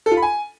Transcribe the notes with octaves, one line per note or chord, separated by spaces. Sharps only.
A4
F4
B5
G#5